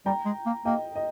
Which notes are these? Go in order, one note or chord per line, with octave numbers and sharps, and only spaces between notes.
G3 G5 A#5
G#3
A#3
A#3 D#5 G5
D#5